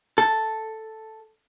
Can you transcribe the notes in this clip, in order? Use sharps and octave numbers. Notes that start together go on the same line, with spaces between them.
A4